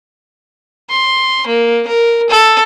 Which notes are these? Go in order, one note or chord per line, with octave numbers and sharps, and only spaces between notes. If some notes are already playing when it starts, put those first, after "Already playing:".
C6
A#3
A#4
A4